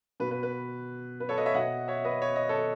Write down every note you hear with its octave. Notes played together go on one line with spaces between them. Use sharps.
B2 B4
B4
B4
B4
A4 C#5
B4 D#5
C#5 E5
B2 D#5 F#5
C#5 E5
B4 D#5
C#5
D#5
A4 C#5